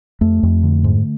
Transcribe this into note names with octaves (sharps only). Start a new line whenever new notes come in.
F2 A3
F2
D3
G#2